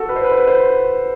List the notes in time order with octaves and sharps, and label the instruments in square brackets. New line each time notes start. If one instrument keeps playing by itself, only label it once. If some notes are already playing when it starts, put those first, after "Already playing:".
Already playing: [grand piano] F#4 A4
B4
C5
B4
C5
B4
C5